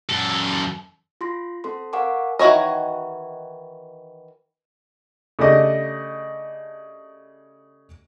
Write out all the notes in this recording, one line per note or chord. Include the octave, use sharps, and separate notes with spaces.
F#2 A4
F4 C6 A#6
C4 A4 C6
A#4 F5 F#5 G#5 C#6 D6
D#3 E3 F#4 C#5 D#5
C#3 A3 D4 G4 D#5 D6